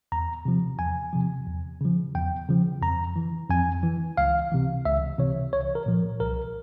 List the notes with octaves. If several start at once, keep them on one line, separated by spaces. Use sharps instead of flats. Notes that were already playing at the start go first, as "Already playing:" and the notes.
E2 A#5
C3 F3
E2 G#5
C3 F3
E2
C#3 F3
E2 G5
C#3 F3
F2 A#5
E3
F2 G#5
E3
C#2 F5
C3 E3
C#2 E5
C3 E3 C#5
C2 C#5
A#4
A#2 F3
C2 A#4